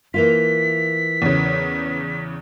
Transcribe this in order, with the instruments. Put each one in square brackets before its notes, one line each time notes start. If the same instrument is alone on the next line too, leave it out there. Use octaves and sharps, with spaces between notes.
[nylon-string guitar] E3 A#3 F4 [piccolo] B6
[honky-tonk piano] E2 C#3